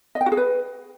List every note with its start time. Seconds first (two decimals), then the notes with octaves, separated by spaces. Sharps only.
0.15 D#5
0.21 G5
0.26 F#4
0.32 G#4
0.37 B4